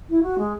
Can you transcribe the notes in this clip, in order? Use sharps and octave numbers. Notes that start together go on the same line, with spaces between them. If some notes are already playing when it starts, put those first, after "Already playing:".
E4
F#4
G#3